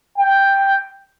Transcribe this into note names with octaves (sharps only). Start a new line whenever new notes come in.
G5